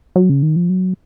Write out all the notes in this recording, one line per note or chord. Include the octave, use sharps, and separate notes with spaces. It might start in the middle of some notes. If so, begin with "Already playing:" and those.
F#3
C#3
D#3
F3
F#3